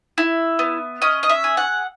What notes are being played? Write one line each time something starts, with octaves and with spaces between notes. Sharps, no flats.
E4
B3
C#4 D#5
D#5
E5
G#4
F#5